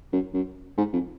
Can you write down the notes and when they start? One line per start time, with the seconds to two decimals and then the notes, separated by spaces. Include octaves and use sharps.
0.13 F#2
0.34 F#2
0.78 G#2
0.93 F2